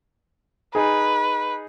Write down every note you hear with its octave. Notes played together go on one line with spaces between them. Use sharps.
D#4 G#4 B4